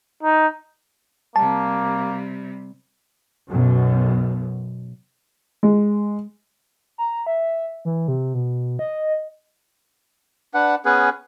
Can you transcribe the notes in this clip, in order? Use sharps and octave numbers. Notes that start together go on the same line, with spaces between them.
D#4
C3 G3 A#3 A5
B1 F#2 B2
G#3
A#5
E5
E3
C3
B2
D#5
D4 B4 F#5
B3 C#4 G#4 B4